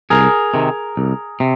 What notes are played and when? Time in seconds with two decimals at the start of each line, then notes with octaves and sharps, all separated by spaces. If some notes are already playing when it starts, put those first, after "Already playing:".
0.10 C2 G#4 A#4
0.54 C3 D#3
0.97 C2
1.40 C3